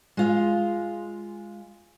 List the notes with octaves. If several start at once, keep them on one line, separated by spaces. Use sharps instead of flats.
G#3 F4 F5